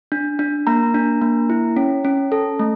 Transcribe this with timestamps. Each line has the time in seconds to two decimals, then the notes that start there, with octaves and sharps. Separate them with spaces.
0.12 D4
0.39 D4
0.67 A#3 A#5
0.94 D4
1.22 A#3
1.50 E4
1.76 C#4
2.05 C#4
2.32 A4
2.59 A3